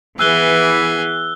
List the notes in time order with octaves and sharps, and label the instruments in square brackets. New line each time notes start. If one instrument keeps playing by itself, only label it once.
[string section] E3 [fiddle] B3 G#4 [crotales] E6 F#6 G7